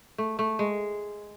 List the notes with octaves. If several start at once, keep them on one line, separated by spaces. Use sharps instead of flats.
A3
A3
G#3